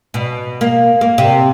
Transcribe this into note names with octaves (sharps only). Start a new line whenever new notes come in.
B2
A#3
A#3
C3